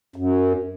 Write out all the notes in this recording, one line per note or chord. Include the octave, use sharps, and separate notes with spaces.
F#2